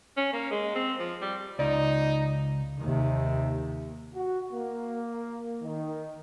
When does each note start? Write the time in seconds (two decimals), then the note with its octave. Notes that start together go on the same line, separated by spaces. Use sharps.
0.17 C#4
0.33 A#3
0.51 G#3
0.75 C4
0.99 F3
1.22 G3
1.59 C#2 D#4 D5
2.80 D#2 C3 D#3
4.14 F#4
4.53 A#3
5.63 D#3